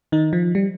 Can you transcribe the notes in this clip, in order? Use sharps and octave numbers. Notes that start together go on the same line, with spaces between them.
D#3 D#4
F3
G3